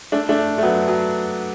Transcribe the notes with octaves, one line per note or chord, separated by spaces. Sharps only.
A3 D4
A3 D4
A3
F#3 B3
F#3